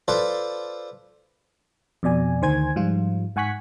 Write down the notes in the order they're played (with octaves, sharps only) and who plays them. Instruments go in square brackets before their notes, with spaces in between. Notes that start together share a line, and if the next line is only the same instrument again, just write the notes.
[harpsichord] F4 A4 B4 C5 D5
[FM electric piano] F2 B2 D5 G#5
D2 D#3 C5 G#5 G#6
G#2 F3 G3 F4
G#2 F#5 G#5 C#6 F#6 B6